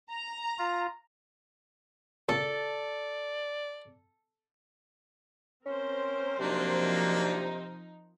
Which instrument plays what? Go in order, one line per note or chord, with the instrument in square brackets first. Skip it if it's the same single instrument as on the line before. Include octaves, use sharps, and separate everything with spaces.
[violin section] A#5
[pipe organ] F4
[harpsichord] C#2 A#2 C#6 [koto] A4 [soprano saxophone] D5
[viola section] C4 A#4 C5 [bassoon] C#4
[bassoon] C3 [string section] F3 D#4 [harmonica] F#3 A#3 D4